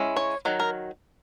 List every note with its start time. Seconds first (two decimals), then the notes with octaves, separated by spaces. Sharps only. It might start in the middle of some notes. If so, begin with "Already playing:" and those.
Already playing: G#3 C#4 E4
0.16 C#5
0.45 D#3 F#3
0.60 A#4